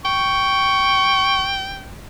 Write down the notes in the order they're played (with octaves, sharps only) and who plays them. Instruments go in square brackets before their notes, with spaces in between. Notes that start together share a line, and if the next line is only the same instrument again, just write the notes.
[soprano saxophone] G5 [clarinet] C#6